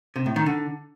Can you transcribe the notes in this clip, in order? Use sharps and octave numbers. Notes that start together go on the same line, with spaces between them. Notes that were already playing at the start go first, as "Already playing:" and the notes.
C3
A2
D#3
D3